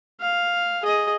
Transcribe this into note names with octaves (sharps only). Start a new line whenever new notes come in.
F5
G#4 D#5